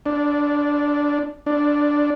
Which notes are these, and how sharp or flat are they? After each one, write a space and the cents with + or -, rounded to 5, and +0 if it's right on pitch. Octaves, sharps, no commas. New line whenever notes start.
D4 -5
D4 +0